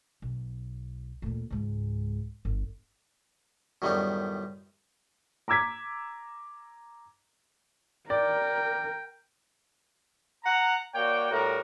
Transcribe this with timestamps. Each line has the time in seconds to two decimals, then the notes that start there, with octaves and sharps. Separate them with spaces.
0.22 B1
1.22 D2 A#2
1.50 C#2 G#2
2.45 G1
3.82 F#2 A2 D#3 G3 B3 D#4
5.48 A#5 D6 E6 G#6 B6
8.10 A#4 D5 G5
10.44 F#5 A#5
10.94 A#3 F#4 C#5 D5 G5
11.31 A2 G3 F#4 A#4